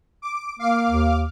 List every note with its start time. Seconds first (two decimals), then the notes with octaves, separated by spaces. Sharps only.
0.22 D6
0.59 A#3 F5 D6
0.90 D#2